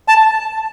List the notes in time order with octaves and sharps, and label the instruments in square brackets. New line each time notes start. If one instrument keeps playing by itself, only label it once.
[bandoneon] A5